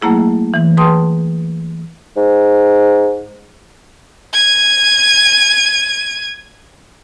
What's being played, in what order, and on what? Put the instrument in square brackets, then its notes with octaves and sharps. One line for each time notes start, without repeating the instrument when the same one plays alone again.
[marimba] F#3 A3 A#3 E4 G#4
E3
G#4 B4 G5 A5 C6 D#6
[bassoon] G#2
[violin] G#6 D#7